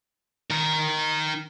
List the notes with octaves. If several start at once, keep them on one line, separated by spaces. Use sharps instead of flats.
D#3 A#4